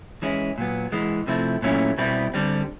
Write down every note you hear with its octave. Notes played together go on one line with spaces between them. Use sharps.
E3 G#3 C#4 E4
A#2 F#3 B3
E3 G#3 B3
C3 F3 A3 C4 E4
A#2 F#3 A3 C#4 E4
B2 G3 C4 E4
D3 G3 C4